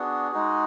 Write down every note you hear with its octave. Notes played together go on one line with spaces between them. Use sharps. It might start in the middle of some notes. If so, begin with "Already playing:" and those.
Already playing: B3 D4 F#4 G#4
G#3 D#4 F#4